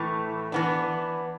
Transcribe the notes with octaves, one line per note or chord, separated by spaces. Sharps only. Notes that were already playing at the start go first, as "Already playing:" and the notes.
Already playing: A2 E3 A3
E3 B3 D4